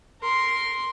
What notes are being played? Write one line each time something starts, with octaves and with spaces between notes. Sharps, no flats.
A#4 C6